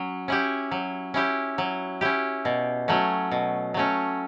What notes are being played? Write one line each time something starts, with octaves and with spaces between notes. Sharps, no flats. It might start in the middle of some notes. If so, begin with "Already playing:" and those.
Already playing: F#3 C#4
C#4 E4 G4
F#3
C#4 E4 G4
F#3
C#4 E4 G4
B2
F#3 A3 C#4
B2
F#3 A3 C#4